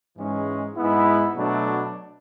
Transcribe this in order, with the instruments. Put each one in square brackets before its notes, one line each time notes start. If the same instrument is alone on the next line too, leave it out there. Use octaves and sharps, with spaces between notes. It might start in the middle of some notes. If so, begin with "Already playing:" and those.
[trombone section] G#2 E3 G#3 C#4
G#2 G#3 B3 E4
B2 F#3 A3 D4